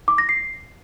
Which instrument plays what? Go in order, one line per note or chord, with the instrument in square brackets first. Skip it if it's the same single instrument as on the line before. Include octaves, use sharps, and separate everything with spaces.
[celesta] D6
A#6
C7